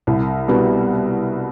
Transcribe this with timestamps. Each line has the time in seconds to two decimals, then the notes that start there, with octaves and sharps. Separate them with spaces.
0.07 C2
0.48 B2 G3 B3 F#4